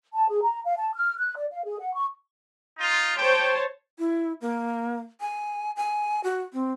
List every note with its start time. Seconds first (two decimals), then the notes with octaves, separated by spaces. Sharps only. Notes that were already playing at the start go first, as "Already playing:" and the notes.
0.14 A5
0.29 G#4
0.42 A#5
0.65 F5
0.77 A5
0.95 F6
1.18 F#6
1.36 D5
1.51 F5
1.65 G#4
1.80 F#5
1.94 C#6
2.78 D#4 F4
3.17 G4 C5 C#5 G5 A5
3.99 E4
4.41 A#3
5.20 G#5
5.76 G#5
6.24 F#4
6.53 C4